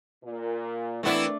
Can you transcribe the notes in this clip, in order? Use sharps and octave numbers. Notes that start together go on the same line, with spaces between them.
A#2
E3 A3 B3 C4 D4 E4 A#4 B4